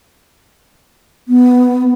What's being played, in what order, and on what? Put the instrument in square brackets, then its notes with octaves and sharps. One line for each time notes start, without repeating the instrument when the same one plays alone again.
[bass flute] B3